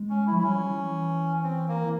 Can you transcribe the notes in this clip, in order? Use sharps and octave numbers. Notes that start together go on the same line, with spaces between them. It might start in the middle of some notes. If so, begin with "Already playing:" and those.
Already playing: G#3
C#4
E4
F3
E4
G3 C#4
E3
C4
A#3
E3